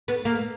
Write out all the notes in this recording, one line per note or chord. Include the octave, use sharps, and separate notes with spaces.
B3
A#3